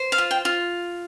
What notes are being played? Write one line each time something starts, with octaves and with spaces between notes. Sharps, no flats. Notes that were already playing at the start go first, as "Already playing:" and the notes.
Already playing: C5
F5
F4
G5
F4